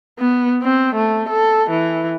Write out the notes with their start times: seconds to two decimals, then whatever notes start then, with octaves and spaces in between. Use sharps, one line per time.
0.19 B3
0.63 C4
0.96 A3
1.29 A4
1.71 E3